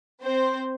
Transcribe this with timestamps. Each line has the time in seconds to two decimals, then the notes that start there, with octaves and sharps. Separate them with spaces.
0.23 C4 C5